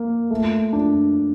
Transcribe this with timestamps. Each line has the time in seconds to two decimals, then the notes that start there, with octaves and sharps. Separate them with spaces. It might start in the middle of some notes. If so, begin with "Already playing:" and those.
Already playing: A#3
0.31 A3
0.73 D4